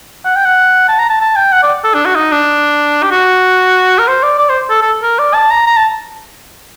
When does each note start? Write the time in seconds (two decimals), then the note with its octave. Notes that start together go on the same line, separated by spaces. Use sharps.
0.25 F#5
0.36 G5
0.45 F#5
0.88 A5
0.99 A#5
1.10 A5
1.21 A5
1.36 G5
1.52 F#5
1.63 D5
1.84 A4
1.94 D4
2.05 F#4
2.15 D#4
2.31 D4
3.02 G4
3.11 F#4
3.98 A#4
4.07 C5
4.23 D5
4.38 D5
4.49 C5
4.70 A4
4.81 A4
5.02 A#4
5.19 D5
5.34 A5
5.51 A#5
5.67 A#5
5.77 A5